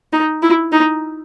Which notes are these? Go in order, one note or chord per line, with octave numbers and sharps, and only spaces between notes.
D#4
E4
D#4